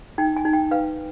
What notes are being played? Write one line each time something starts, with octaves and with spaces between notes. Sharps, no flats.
D#4 G5
G#5
D#4
G5
B4 F5